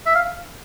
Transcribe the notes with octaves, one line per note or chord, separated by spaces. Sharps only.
E5
F5